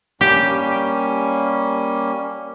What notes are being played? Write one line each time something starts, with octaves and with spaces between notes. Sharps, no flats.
G3 A#3 C#4 G4